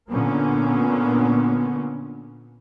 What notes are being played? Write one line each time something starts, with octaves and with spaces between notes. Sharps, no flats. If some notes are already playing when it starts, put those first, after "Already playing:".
A#2 D3 A#3 B3 C#4